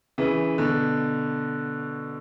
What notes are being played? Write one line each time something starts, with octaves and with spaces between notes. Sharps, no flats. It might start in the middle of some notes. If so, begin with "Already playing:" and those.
C#3 E3
B2 D3